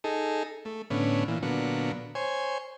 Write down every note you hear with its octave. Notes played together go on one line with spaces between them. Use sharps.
D#4 G#4 A4
A3
A2 D3 B3 C#4
A#2 E3
A#2 D3 F#3 B3
C5 C#5 G#5